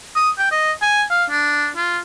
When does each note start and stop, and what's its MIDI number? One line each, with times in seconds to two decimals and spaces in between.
0.16 0.30 87
0.38 0.49 79
0.51 0.72 75
0.82 1.04 80
1.10 1.24 77
1.30 1.69 62
1.77 1.99 65